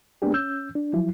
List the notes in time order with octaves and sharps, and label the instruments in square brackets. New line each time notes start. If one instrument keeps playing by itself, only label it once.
[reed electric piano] G#3 A#3 B3 D4 G4 G#4
C#4 E6 G6
D4
F3 F#3 E4